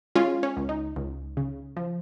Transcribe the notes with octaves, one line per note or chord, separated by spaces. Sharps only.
G#3 C#4 F4
C#4
C#2
D#4
C#2
C#3
F3